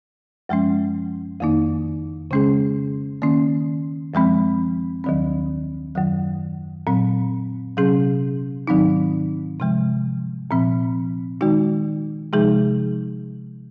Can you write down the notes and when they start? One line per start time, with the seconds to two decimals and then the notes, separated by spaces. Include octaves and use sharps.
0.49 F#2 F3 G#3 C#4
1.40 F2 D#3 A#3 D#4
2.31 C#3 G#3 C#4 G#4
3.22 D#3 A#3 C#4
4.14 F#2 F3 G#3 C4
5.04 D#2 D#3 F#3 C4
5.95 F#2 D#3 F#3
6.87 A#2 F#3 C4
7.77 C3 F#3 C#4 G#4
8.67 G#2 D#3 F#3 C4 D#4
9.60 C3 F3 G#3
10.51 A#2 F3 C4
11.41 D#3 G#3 D#4 F#4
12.33 C3 F3 G#3 D#4 G#4